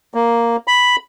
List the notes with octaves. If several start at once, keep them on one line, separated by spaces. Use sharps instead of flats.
A#3
B5